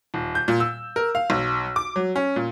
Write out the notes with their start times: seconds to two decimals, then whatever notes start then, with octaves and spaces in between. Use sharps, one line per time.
0.14 D#1
0.35 G6
0.48 A#2
0.60 E6
0.96 A#4
1.15 F5
1.30 B1
1.76 D6
1.96 F#3
2.16 C#4
2.36 A#2